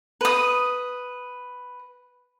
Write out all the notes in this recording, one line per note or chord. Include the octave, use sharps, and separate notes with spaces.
B4 D#6